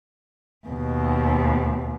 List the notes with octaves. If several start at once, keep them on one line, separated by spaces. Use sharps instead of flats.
D#2 B2